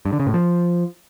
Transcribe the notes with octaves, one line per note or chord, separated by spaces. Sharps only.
G2
D3
C#3
A2
F3